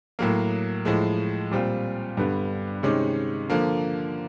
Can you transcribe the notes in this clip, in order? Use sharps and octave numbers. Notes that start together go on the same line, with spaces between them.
A2 F#3 A#3
A2 F3 G#3
A#2 G3 C4 F4
G2 D3 G3 B3
C3 D#3 G#3 C#4
D3 F3 A#3